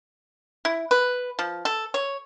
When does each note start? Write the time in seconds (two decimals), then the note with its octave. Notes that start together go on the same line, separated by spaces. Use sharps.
0.65 E4
0.91 B4
1.39 F3
1.65 A4
1.94 C#5